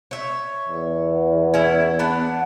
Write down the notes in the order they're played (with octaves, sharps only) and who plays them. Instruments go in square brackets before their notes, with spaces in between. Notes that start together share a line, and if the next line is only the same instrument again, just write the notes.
[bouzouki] C#5 E5
[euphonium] E2
[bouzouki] C#4 E4
B3 D4 F#5